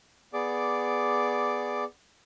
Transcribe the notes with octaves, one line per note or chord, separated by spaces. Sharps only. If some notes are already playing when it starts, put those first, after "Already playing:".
B3 G#4 D5 D6